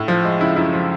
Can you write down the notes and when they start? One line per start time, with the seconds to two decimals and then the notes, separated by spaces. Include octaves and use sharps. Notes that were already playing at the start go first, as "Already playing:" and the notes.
Already playing: A2
0.08 F3
0.25 G#3
0.40 C#3 E4
0.56 F#2 E4
0.73 F3